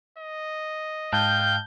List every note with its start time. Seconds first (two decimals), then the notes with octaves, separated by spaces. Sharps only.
0.19 D#5
1.13 G#2 F5 G5 A5 F#6 G6